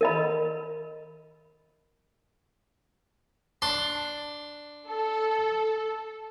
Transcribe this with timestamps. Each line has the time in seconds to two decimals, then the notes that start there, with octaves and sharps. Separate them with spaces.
0.01 A#4 D#5 B5
3.62 D4 C6
4.88 A4